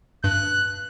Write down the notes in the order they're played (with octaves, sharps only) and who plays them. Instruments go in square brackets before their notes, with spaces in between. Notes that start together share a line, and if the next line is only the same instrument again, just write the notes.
[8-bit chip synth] G2 [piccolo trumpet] F#6